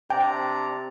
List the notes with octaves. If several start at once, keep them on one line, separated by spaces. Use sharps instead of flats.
C3 D4 D5 G5 A#5